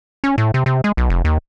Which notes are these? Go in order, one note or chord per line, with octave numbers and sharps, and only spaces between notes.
C#4
A2
C3
C3
G#3
B1
F1
D#2